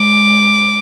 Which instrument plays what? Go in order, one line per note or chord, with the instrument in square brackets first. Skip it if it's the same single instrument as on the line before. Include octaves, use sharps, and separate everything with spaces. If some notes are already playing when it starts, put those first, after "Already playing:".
Already playing: [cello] G#3 [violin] D6